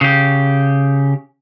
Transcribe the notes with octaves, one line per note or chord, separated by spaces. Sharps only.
C#3 G4